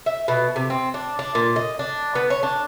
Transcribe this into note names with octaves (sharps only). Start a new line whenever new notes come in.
E5
B2
C3
C4
D4
D4
A#2
D#5
D4
B3
C#5
D4